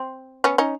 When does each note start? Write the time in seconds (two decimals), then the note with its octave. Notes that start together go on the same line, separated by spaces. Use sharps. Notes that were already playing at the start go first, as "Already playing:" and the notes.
Already playing: C4
0.44 B3 C#4
0.58 C#4 D#4